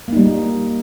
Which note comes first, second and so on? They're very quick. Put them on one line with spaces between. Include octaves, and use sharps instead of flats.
A#3 D#4 G3